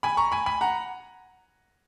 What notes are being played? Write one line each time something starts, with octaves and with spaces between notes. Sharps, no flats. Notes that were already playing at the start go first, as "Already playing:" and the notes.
G#5 B5
A#5 C#6
G#5 B5
G#5 B5
F#5 A#5